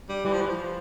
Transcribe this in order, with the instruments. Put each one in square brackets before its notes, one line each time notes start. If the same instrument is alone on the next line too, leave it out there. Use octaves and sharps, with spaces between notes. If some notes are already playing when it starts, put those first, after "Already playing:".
[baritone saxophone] G3
[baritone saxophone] E3 [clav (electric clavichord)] G3
[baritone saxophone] F3
E3
F3